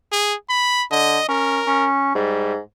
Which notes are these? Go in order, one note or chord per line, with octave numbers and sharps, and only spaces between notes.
G#4
B5
D3 D#5
C#4 A#4
C#4
G#2 G3